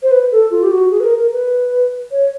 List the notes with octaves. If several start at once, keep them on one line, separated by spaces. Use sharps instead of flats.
C5
B4
A4
F4
G4
F#4
G#4
B4
A#4
A#4
B4
C#5